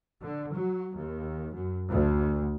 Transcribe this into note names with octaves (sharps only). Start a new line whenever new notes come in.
D3
F#3
D#2
F#2
D2